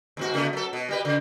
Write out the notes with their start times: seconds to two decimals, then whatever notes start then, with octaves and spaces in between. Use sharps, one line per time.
0.17 D#2 G#2 F#4
0.34 C#3 A3 B3
0.53 F#3 A4
0.73 B2
0.89 G3 G4 B4
1.05 C#3